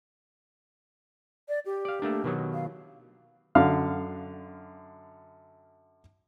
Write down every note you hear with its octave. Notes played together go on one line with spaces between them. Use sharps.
D5
G4
D5 F5
A3 A#3 D4
B2 D#3 F#3
F5
F#2 D3 F5 F6